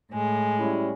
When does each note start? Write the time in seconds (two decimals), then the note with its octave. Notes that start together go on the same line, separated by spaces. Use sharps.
0.11 A2 G#3
0.59 G3 C#4 E4